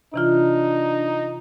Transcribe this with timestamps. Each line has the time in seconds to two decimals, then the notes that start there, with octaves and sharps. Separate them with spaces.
0.14 C3 E3 D4 D#4 F4